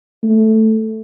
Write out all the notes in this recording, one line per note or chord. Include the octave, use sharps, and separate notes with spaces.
A3